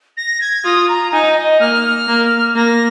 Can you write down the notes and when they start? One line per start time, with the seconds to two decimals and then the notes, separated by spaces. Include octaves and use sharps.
0.17 A#6
0.41 G#6
0.65 F4 D#6
0.89 A#5
1.12 D#4 G#5
1.37 D#5
1.60 A#3 F6
2.08 A#3
2.56 A#3 A#6